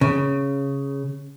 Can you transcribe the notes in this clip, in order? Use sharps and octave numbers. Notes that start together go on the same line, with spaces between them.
C#3